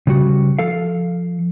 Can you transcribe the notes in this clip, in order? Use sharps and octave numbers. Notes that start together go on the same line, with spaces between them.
C#3 G3 F#4
F3 A4 F5